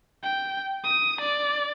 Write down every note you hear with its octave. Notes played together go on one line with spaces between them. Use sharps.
G5
D#6
D5